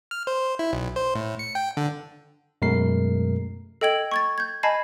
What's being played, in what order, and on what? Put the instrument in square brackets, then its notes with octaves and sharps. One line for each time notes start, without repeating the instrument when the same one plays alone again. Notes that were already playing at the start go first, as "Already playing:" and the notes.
[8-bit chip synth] F6
C5
E4
B1
C5
A2
C#7
G5
D3
[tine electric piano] F#2 B2 G#3 A3 A#4 C7
[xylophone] A4 D#5 G5 G#6 F#7
C#6 G#6 A6
G6 G#6
D#5 G#5 A5 B5 G#6 C7